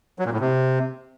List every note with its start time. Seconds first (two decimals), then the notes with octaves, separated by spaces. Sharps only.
0.19 F#3
0.26 A#2
0.33 A2
0.40 C3